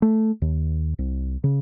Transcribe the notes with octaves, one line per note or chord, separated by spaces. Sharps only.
A3
D#2
C2
C#3